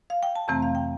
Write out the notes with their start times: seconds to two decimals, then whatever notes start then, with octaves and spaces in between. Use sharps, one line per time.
0.10 F5
0.23 G5
0.36 A5
0.48 F2 C3 E3 A3 C4 A#5
0.62 F5
0.75 G5